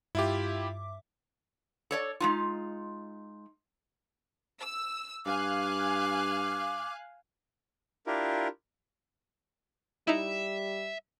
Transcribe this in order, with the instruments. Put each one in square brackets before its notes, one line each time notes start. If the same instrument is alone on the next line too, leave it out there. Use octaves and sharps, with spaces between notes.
[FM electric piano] G2 E5 D6 [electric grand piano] E4 F4 G4
[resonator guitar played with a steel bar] A4 C#5 D5
G#3 D#4 F4
[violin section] E6
[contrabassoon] G2 [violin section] F5 G#5 F#6 [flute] D6
[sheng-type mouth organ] D4 E4 F4 G4 A#4
[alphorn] G3 [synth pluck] D#4 E4 [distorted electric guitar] E5